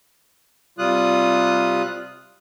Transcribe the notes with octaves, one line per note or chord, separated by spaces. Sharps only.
C3 G3 F4 D#6 F#6